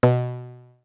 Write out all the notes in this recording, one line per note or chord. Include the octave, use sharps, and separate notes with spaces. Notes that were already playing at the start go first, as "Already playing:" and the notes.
B2